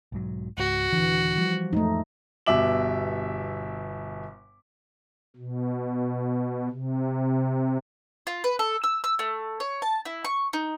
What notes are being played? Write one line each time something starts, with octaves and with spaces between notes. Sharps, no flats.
B1 G#2 F#3
C#2 G#2 F#4
D#1 D3 E3
F3 G3
F2 A2 G#3 A3 D#4
G1 B2 G3 E5 D6 F#7
B2
C3
F4
B4
A4
E6
E6
A3
C#5
A5
E4
C#6
D#4